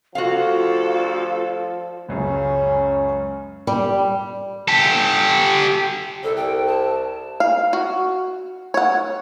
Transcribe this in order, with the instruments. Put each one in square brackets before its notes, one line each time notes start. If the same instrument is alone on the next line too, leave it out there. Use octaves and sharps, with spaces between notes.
[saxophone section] D2 G3 A4 [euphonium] F3 [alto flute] F4 [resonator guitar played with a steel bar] F#4 F5
[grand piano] C#2 F#2 C#3 [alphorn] C#4
[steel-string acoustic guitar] G3
[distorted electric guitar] G4 A4
[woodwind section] C2 [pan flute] A4
[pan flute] G5
A5
[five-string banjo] F5
F#4
C#5 F#5